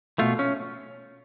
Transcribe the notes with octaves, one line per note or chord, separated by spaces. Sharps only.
B2 A3 F4
C#4